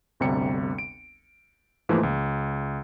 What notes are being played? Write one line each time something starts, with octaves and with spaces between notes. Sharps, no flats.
G1 D2 C3 G3 C#7
D7
G#2 E3 F3 A3 A#3
C#2